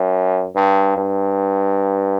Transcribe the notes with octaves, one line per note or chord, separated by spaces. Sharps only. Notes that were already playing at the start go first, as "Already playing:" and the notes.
Already playing: F#2
G2
G2